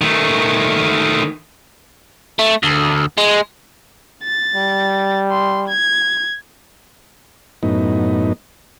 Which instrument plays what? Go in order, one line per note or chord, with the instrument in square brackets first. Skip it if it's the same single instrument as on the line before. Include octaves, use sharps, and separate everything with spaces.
[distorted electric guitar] D#3 A3
[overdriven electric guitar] A3
D2
G#3
[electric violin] A6
[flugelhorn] G3
[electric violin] C6
G#6
[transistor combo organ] F#2 A2 B3 D#4